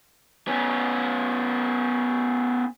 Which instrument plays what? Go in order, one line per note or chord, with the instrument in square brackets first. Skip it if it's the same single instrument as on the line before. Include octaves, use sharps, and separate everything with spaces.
[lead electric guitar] B3 C#4